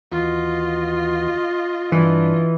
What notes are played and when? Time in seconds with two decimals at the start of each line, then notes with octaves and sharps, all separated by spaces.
0.12 D#2 E3 F4 F#4 D#5
1.92 G2 E3 D4